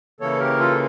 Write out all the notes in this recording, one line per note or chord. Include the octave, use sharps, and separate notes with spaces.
C#3 E3 A#3 A4 C#5
G4 A#4
F4 A4